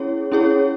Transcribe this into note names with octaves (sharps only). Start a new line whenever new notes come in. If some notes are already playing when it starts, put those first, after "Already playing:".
Already playing: C#4 E4 G#4 C#5
C#4 E4 G#4 C#5